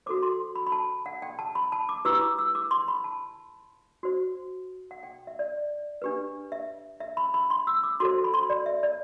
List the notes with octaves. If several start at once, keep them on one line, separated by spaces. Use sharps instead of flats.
F#4 A4 C5 D6
C6
B5
B5
A5
F#5
G5
A5
B5
A5
D6
E4 G4 B4 E6
D6
E6
D6
C6
B5
A5
F#4 C5
F#5
G5
E5
D5
D4 G4 B4
E5
E5
B5
B5
C6
E6
D6
F#4 A4 C5 C6
B5
C6
D5
E5
D5